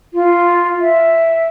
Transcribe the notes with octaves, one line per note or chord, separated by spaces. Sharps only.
F4
E5